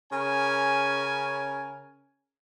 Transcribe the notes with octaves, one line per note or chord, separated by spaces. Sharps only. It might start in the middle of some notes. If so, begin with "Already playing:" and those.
C#3 C#4 A#4 G#5